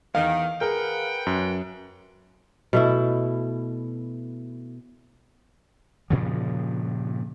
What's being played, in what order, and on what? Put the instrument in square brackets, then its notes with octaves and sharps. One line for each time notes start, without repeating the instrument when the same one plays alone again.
[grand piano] E2 [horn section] D#3 [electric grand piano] F5
[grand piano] G#4 A#4 [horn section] B4 F#5 G5
[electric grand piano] F#2
[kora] B2 A3 E4
[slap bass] G2 A#2 C#3 F3